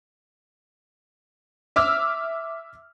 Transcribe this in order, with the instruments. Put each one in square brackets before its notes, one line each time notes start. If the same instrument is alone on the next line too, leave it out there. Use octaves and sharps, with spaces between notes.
[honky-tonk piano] E5 D6 E6 F6